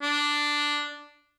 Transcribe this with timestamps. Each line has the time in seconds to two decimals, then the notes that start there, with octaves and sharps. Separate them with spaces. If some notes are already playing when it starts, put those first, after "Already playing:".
0.02 D4